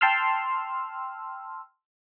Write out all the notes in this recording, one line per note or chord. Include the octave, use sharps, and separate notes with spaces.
G5 A5 C6 E6 F6